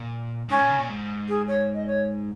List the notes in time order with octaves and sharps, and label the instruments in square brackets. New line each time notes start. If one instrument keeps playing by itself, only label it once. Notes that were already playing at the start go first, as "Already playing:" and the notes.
Already playing: [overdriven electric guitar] A#2
[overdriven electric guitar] G#2 [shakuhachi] C#4
[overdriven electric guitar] A#2
C#3
A#2
G#2
[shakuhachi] G#4
C#5
D#5
C#5